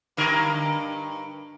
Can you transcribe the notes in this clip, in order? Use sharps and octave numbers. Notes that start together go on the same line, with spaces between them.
G2 D3 A#4